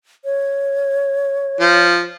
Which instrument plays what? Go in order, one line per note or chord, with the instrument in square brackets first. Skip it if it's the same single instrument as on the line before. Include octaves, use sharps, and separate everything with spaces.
[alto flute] C#5
[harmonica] F3